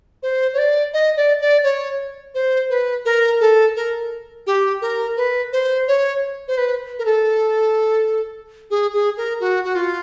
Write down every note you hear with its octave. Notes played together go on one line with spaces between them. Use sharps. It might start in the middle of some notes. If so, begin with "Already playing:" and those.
C5
C#5
D5
D#5
D5
D5
C#5
C5
B4
A#4
A4
A#4
G4
A#4
B4
C5
C#5
C5
B4
A#4
A4
G#4
G#4
A#4
F#4
F#4
F4